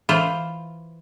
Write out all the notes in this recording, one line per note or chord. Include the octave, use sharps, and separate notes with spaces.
E3 F4 C5